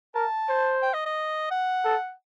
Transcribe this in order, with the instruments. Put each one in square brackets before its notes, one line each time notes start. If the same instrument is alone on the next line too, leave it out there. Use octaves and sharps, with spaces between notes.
[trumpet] A#4 [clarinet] A5
[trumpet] C5
[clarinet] G5
D#5
D#5
F#5
[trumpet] A4